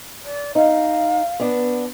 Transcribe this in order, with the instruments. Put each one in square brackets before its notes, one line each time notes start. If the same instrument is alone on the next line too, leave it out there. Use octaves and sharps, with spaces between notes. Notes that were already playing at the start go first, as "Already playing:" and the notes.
[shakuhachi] D5
[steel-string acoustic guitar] D#4 [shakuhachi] F5
[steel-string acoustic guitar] B3 D4